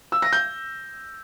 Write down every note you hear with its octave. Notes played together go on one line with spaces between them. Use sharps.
E6
A#6
G6